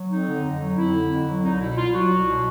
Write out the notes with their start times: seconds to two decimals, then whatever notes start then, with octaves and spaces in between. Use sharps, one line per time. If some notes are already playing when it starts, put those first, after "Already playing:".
Already playing: F#3
0.10 F2 D#4
0.27 D3
0.43 F2
0.60 F#3
0.77 F2 E4
0.94 D3
1.11 F2
1.27 F#3
1.43 C2 D#4
1.60 B2 E4
1.77 C2 F4
1.94 F#3 F#4
2.10 C2
2.27 B2